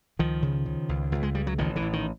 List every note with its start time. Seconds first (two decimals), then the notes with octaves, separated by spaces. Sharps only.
0.19 C#2 D#3 F3
0.42 C#3
0.66 C#3
0.89 C#2
1.12 C#2
1.23 G#3
1.35 C#3 G3
1.47 F#3
1.58 A1 D#3 F3
1.76 D3 E3
1.82 A2
1.93 D#3